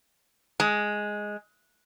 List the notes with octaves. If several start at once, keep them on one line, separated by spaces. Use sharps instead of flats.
G#3